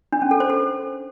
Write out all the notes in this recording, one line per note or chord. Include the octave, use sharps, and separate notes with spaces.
D4
C#4
A4
C5
A4